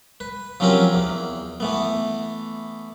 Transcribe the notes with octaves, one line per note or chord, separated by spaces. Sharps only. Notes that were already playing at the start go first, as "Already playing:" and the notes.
B4
F3 F#3 C4 C#4 G4 A#4
E2
E3 A3 B3